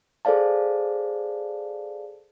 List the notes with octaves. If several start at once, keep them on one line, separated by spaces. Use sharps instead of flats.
G#4 A4 C5 D5 F5 A5